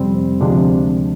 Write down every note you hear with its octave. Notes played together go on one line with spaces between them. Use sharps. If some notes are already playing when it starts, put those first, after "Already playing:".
Already playing: F2 C3 G3 C4
D2 C3 F3 G#3 D4